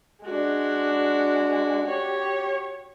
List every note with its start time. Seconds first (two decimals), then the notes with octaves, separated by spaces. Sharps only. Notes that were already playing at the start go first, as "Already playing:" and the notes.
0.25 G#3 D4 F#4
1.86 G4 C#5